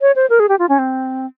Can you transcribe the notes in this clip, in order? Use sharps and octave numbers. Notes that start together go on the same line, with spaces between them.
C#5
C5
A#4
G#4
G4
F4
C#4
C4